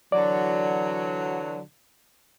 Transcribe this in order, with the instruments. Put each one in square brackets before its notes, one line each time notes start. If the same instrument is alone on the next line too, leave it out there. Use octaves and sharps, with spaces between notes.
[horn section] D3 E3 F#3 [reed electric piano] D5